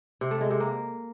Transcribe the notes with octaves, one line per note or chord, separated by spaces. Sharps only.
C3
A3
G#3
C3
A#3